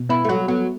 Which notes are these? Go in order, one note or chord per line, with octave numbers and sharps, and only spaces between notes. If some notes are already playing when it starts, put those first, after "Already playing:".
Already playing: B2
B3 E4
A3
F#3 F#4
F#3 B3